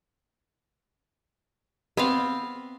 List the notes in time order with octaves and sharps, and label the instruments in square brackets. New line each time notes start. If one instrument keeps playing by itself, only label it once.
[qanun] B3 C4 F5